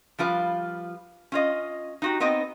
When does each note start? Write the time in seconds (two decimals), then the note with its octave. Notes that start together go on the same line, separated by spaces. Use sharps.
0.19 F3 G3 F4 B4
1.32 C#4 F4 D#5
2.02 D#4 F#4 G4
2.20 B3 C4 D#4 D#5